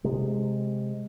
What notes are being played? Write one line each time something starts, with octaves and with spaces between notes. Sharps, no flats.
C3 G#3